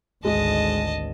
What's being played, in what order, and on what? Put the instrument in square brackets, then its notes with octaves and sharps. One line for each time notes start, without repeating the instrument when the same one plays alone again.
[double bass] G#1 D2 [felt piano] G#3 [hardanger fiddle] D#5 A5